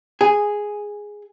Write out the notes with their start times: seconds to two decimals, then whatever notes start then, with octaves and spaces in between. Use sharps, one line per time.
0.21 G#4